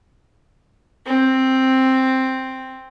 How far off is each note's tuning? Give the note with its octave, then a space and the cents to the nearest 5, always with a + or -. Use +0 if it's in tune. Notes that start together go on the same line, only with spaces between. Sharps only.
C4 +5